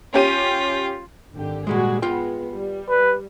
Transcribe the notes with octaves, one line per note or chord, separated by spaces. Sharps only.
C#4 F4 G4 D#7
G#1 D3 G4
A#2 G3 G#3 F#4 G#4
G#3 B3 F4 G5
G3
B4